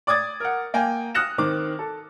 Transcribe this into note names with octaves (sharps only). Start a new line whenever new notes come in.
D5 D6 D#6 G#6 A6
A#4 F#5
A#3 G5 G#5
D#6 F6 F#6 A#6 C#7 E7
D#3 C4 D6
A4